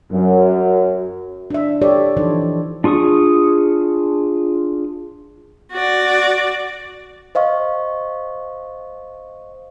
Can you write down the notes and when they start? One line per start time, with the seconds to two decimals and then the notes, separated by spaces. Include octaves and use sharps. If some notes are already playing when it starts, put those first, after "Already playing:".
0.12 F#2
1.50 D4 E5
1.82 G4 A4 C#5 D5
2.17 E3 F3 D4 D#4 A4 C5
2.84 D4 F4 G#4 C#6 D#6
5.72 F#4 D5
7.35 C5 D#5 F5 C#6